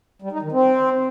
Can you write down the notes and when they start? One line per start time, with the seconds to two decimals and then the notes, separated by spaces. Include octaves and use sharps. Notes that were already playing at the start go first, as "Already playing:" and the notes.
0.22 G3
0.32 D#4
0.42 D#3
0.52 C4